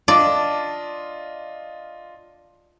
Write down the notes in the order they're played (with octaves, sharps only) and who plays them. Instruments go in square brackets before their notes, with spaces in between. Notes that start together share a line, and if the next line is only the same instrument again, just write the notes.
[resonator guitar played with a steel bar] D4 [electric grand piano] F4 D#5 [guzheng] D5